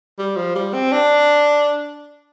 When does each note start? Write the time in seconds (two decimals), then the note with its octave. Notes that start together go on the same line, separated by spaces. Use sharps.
0.19 G3
0.37 F3
0.55 G3
0.74 C4
0.92 D4